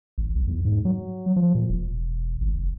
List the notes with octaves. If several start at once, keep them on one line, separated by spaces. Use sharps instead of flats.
A1
B1
E2
G#2
F#3
F3
A#2
E1
G#1
F1